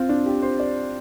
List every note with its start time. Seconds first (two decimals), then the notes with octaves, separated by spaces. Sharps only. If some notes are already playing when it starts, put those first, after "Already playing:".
Already playing: C4 F4
0.09 D4
0.26 G4
0.42 C5
0.59 D5